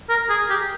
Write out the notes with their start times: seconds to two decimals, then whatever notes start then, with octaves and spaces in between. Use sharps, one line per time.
0.09 A#4
0.30 G#4
0.50 G4